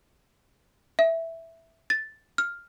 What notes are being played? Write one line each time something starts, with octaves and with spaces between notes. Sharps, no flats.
E5
A6
F6